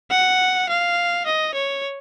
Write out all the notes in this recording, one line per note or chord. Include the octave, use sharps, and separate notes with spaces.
F#5
F5
D#5
C#5